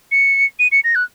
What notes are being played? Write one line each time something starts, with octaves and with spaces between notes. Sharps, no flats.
C#7
D#7
C#7
A#6
F#6